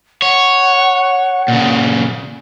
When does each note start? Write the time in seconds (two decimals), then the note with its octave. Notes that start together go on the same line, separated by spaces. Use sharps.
0.22 C#5 F#5
1.48 A#2 C#3